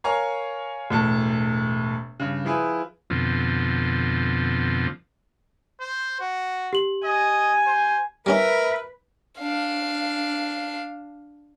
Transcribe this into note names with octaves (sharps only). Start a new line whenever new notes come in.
A#4 C#5 F5 G#5 A#5 C#6
E1 A2 A5
G2 C#3
F3 E4 G#4 B4
F2 B2 D3 F3 C4
C5
F#4
G4 F#7
D#5 G#5
C5
G3 C#4 D#4 A#4 B4 E5
D4 F5